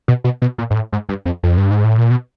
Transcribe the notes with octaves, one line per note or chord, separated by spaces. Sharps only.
B2
B2
B2
A#2
G#2
A2
G#2
G2
F2
F2
G2
G#2
A2
A#2
B2